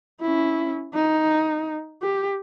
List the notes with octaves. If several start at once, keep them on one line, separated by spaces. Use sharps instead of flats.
C#4 E4
D#4
G4